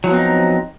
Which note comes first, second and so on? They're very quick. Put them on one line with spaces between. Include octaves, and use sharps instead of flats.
F#3 F3 B3 C4 D#4